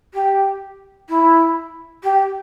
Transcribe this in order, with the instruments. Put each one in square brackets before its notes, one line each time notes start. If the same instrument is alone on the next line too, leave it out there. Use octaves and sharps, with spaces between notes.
[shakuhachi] G4
E4
G4